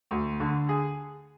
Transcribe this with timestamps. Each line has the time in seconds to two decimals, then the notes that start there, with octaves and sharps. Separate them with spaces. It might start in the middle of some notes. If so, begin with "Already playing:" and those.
0.11 D2
0.40 D3
0.69 G#4